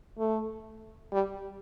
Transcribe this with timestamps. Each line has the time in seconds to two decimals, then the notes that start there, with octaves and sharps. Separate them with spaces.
0.18 A3
1.12 G3